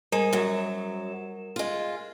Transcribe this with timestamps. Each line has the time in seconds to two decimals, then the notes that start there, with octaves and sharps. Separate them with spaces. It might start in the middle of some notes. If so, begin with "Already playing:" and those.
0.12 G3 G#3 A#4 E7
0.33 F#2 F#3
1.56 G#3 F4